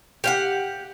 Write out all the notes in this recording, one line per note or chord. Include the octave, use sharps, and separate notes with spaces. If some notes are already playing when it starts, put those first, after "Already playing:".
G4 F5 F#5